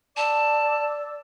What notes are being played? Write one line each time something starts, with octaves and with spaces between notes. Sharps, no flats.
D5 A5 D6 E6